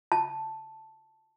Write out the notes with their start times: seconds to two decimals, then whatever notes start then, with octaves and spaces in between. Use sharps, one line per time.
0.12 A5